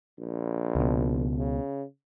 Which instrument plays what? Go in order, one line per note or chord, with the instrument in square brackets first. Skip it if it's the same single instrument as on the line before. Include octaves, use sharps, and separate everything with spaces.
[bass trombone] A#1
[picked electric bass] C#2 B2
[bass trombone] C#3